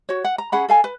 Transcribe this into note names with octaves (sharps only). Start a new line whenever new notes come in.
F#4 C#5
F#5
A#5
C#4 G#4 F#5 B5
A4 F5 G#5
B4